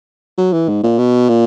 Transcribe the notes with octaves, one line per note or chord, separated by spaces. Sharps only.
F#3
E3
G#2
A#2
B2
A#2